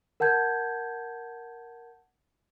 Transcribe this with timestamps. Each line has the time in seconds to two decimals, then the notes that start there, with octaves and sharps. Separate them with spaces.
0.20 A#4 F#5 A5 G6 G#6